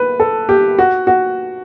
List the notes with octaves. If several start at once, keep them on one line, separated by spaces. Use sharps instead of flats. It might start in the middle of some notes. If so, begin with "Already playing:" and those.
Already playing: B4
A4
G4
F#4
F#4